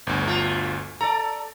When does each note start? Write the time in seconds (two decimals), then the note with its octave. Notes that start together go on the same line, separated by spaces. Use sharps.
0.07 G1 D2
0.27 A3 F4
1.01 A4 D5 A#5